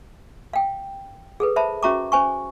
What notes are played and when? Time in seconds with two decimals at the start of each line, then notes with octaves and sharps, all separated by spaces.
0.53 F5 G5
1.40 G#4 A4 B4
1.56 C5 E5 A5 B5
1.83 C#4 F#4 E5 A#5 C#6 D6
2.12 C#4 C5 G#5 C#6